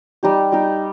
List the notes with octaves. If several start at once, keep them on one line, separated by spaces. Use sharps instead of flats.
G3 D#4 G4
G3 D#4 G4